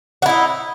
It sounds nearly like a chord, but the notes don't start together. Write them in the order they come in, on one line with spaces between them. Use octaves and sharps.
F#4 E4 D#4